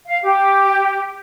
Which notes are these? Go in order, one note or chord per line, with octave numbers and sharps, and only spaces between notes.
F5
G4